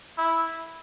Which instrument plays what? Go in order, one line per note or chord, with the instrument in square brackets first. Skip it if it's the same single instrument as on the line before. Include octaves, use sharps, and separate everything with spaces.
[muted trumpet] E4